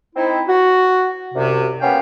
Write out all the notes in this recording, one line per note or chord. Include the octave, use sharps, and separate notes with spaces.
C4 D#4 E4
F#4
C2 F#2 C3
A#3 B3 C#4 G4 F5 G5